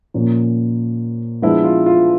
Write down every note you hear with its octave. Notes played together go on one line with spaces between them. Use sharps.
A#2 F3 A#3 C#4
F3 G#3 B3 D4 E4
F4
F4